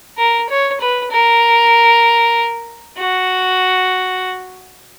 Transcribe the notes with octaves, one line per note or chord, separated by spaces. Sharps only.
A#4
C#5
B4
A#4
F#4